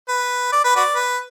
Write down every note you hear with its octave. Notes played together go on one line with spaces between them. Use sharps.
B4
D5
B4
F#4 B4 D5
B4